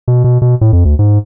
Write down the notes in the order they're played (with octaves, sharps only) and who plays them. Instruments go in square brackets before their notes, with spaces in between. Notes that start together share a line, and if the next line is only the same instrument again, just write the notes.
[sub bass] B2
B2
B2
A2
F2
D2
G#2